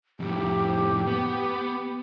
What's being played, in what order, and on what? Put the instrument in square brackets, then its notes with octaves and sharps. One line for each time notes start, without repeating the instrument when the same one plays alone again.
[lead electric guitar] F2 A2 [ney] G4
[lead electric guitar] B3